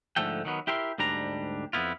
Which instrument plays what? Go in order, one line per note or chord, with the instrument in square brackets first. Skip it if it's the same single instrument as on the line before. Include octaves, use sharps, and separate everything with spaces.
[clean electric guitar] G#2 D3 F3 A3 A4 G5
D#3 F#3 B3
E4 G4 A#4 E5 C6
D2 G#2 G3 D4 A#5
F2 G#2 B3 E4 F4